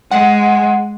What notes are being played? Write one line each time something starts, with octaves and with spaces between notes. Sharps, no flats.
G#3 F#5